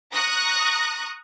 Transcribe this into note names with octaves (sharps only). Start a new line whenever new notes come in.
A#5 C#6 D#6 F#6 A#6